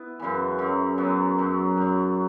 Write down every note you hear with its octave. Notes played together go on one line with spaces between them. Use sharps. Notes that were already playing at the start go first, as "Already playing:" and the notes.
Already playing: B3 E4
F#2 C#3 E3
F#2 F#3
F#2 F#3 B3
F#2 F#3
F#2 F#3